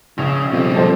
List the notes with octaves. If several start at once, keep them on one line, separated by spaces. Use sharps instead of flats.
A#1 C#3 F7
F2 B2 G3
F3 A4 C5